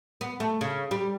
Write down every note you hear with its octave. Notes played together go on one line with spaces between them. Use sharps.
B3
A3
C#3
G3